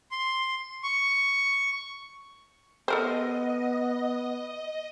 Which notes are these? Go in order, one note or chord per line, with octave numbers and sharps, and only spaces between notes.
C6
C#6
B3 A4 A#4 C5 D#5